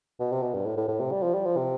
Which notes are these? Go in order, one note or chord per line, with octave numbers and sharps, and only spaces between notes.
B2
C3
B2
G2
A2
A2
A2
C3
G3
F3
G3
F3
C3